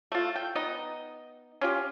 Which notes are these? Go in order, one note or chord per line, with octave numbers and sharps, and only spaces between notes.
A3 F4
G5
B3 D#4 D#5
C#4 F4 G4